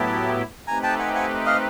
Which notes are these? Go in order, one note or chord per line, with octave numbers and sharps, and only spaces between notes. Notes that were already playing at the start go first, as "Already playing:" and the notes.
Already playing: A2 F#3 B3 E4 G4 A5 B5
A3 C4 D#4 G4 B4 G#5 A#5
G5 A5
F#5 G#5
F#5 G#5
D#5 F5